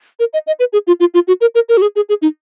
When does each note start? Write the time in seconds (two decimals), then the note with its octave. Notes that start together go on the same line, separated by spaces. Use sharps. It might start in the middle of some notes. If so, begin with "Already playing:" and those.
0.19 A#4
0.33 D#5
0.47 D#5
0.59 B4
0.73 G#4
0.87 F4
1.00 F4
1.14 F4
1.28 F#4
1.41 A#4
1.55 A#4
1.69 A#4
1.77 F#4
1.82 G#4
1.96 G#4
2.09 G#4
2.22 D#4